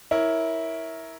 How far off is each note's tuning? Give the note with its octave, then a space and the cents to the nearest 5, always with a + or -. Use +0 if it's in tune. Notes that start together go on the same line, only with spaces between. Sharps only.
E4 -15 A#4 +0 C#5 +0